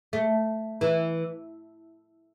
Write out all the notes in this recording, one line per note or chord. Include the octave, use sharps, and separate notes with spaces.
A3
E3